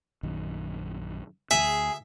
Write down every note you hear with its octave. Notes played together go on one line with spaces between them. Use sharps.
A#1 F#2 D#3
D2 G#4 E5